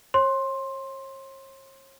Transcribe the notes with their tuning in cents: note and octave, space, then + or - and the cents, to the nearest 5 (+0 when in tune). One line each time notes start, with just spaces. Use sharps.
C#5 -40 C6 +15